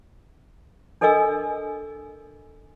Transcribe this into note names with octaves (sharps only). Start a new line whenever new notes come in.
D4 A4 A#4 D#5 G#5 E6